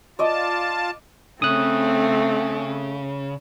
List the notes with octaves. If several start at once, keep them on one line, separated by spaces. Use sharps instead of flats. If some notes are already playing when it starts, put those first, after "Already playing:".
F4 D5 D#5 A5 D6
C#3 A3 C4 D#6 F#6